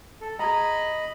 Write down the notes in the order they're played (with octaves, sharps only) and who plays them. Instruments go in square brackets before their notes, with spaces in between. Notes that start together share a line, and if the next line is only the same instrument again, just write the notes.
[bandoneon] A4
[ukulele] G#4 A#5 [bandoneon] D#5 B5